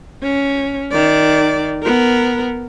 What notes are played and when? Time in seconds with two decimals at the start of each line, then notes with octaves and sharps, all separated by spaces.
0.23 C#4
0.91 D#3 D5
1.83 B3 A#4